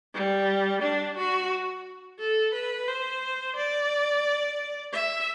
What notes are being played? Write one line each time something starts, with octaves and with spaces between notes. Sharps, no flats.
G3
D4
F#4
A4
B4
C5
D5
E5